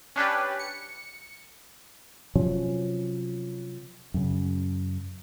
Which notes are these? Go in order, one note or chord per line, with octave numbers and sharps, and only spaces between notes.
C#4 D4 G4 B4
C#7
C3 F3 F#3 C#4
F#2 C#3